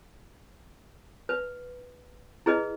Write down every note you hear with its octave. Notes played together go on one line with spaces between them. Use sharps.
B4
E4 G#4 B4 D#5